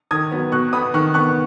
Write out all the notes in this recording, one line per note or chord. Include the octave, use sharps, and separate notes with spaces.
D#3 D#6 G#6
F#3 B3
B2 C#6 F#6
B3 B5 D#6
D#3 C#6 F#6
B3 C#6 F#6